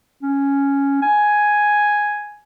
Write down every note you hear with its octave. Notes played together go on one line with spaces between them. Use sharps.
C#4
G#5